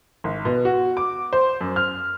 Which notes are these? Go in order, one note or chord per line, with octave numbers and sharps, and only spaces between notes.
G#1
B2
F#4
D6
C5
F#2
F6